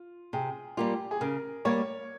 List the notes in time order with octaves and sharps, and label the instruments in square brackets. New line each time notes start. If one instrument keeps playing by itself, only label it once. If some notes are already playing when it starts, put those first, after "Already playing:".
Already playing: [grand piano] F4
[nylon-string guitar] C3 [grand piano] G#4
[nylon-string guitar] G3 A#3 F4 [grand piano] G4
[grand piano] G#4
[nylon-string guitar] C#3 [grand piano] A#4
[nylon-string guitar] G3 A#3 [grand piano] C#5